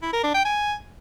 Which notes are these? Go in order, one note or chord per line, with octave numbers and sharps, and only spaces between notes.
E4
A#4
D4
G5
G#5